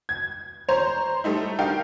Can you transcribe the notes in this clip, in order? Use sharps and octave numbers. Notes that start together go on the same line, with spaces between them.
G#6
C5 C#5 A#5 C6
G3 A3 D#4 E4
D4 D#4 G4 A#4 F5 G5